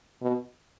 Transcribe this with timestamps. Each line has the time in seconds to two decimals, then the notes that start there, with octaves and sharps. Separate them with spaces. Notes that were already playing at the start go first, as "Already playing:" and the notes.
0.22 B2